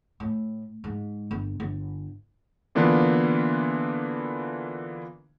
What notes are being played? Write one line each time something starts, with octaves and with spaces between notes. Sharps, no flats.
A2
G#2
G1
G1
D3 E3 A#3 B3 D4 F4